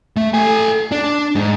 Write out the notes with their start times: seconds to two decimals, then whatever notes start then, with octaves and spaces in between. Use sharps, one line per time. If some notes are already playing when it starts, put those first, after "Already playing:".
0.17 A3
0.34 A4 G#5
0.92 D4
1.35 G#2